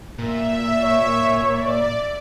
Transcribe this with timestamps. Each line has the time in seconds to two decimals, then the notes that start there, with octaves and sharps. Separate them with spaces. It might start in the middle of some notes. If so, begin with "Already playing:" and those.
0.18 A#2 E5
0.81 C#5
1.50 D5